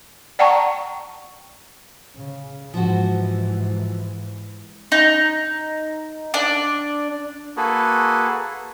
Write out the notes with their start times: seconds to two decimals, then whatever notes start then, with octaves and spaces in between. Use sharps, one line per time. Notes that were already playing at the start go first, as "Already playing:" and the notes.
0.39 D5 F#5 G5 A5 A#5 C#6
2.17 C#3
2.74 G#2 E3 F3 F#4
4.92 D#4
6.34 D4
7.57 A#3 F#4 G#4 A4 B4